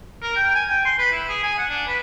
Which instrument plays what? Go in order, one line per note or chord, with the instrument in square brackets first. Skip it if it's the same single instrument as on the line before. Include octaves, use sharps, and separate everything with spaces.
[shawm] A#4
G5
G#5
G5
C6
B4
E4
G#4
G#5
F#5
D4
B4